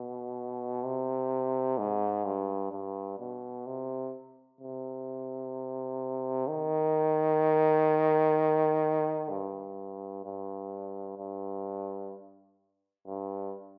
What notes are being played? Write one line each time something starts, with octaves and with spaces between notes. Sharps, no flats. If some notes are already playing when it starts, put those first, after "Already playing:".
Already playing: B2
C3
G#2
G2
G2
B2
C3
C3
D#3
G2
G2
G2
G2